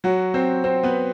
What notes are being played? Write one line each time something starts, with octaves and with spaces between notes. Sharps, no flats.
F#3 F#4
C4 C5
C4 C5
B3 B4